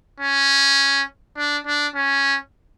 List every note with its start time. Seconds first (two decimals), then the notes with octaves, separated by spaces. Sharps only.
0.20 C#4
1.37 D4
1.67 D4
1.95 C#4